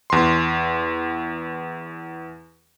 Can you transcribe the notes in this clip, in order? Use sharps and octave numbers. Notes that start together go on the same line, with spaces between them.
E2 C6